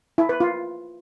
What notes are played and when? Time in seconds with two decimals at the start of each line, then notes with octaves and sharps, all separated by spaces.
0.18 E4
0.29 B4
0.40 F4